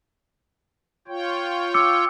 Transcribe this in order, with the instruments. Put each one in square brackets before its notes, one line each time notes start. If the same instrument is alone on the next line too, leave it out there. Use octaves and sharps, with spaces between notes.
[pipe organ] F4 C#5 G5
[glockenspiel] D6 E6 C#7